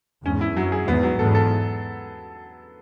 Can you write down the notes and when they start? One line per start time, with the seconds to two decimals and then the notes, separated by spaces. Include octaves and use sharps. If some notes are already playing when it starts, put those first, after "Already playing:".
0.25 E2 G#2 C#4
0.41 E4
0.56 F#2 F#3
0.72 G#4
0.87 E2 G#2 B3
1.03 F#3
1.19 E2 G#2 A4
1.35 A4